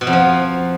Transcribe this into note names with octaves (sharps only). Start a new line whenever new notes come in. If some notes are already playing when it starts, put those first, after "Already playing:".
B2
F2
F3